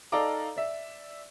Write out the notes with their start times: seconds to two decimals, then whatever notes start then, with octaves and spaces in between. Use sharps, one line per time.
0.12 D#4 A4 D5 F5 A#5 D6
0.56 D5 E5